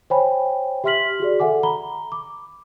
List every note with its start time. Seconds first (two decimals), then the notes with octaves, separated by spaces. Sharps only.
0.10 C5 C#5 G5 G#5 B5
0.84 G4 E5 C6 F6 B6 F#7
1.20 F#4 G#4 D5
1.40 A4 E5 F#5 G#5 D6
1.63 A#5 B5 G7
2.12 D6